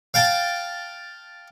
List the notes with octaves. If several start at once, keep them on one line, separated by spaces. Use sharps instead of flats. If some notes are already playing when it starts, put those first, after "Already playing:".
F5 G5 A5